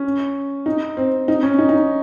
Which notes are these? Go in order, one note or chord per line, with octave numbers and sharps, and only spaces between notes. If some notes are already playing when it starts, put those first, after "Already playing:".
Already playing: C#4
D#4
C4
D#4
C#4
D#4
D#4